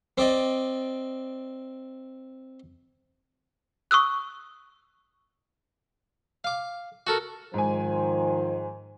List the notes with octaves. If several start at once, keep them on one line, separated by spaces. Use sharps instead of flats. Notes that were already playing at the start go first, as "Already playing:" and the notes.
C4 D5 D#5
C#6 D#6 E6 F#6
F5 D6
F#4 A4 A#4
G#2 D#3 F3 C5 G#5